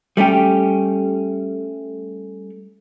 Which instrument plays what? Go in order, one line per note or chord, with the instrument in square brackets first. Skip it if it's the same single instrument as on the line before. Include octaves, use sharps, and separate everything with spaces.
[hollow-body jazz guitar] G3 A3 C#4 G4